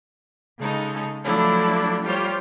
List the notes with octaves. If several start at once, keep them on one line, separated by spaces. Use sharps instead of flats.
C#3 G#3 D#4 A4
F3 F#3 A3 D4 E4
G3 F4 G4 C5 C#5